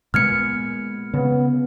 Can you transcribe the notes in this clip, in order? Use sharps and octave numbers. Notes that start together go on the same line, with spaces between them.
A#2 G#3 B3 F6 G#6 C#7
C#3 B3